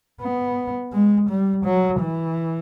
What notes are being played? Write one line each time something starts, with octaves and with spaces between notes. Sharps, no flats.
B3
G#3
G3
F#3
E3